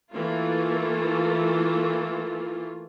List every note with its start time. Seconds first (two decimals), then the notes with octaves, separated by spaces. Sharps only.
0.11 E3 A3 A#3 F4